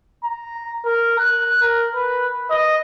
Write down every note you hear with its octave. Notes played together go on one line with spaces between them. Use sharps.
A#5
A#4
F#6
A#4
B4
D#5